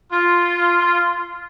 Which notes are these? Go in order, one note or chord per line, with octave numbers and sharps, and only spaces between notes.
F4